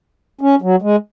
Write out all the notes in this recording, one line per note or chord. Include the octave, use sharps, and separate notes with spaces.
C#4
F#3
G#3